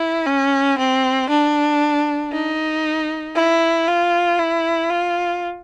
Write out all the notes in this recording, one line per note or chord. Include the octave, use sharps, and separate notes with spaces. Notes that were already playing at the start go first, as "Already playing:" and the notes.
Already playing: E4
C#4
C4
D4
D#4
E4
F4
E4
F4